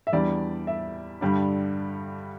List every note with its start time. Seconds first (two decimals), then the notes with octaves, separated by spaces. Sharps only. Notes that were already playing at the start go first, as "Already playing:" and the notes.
0.07 E5
0.13 E2 E3 G3 D4 D5
0.67 E5
1.21 G2 D3 G3 D4